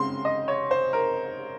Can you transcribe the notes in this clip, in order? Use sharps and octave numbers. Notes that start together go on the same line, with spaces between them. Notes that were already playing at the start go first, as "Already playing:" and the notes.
Already playing: C#3 G#3 C4 C6
D#5
C#5
C5
A#4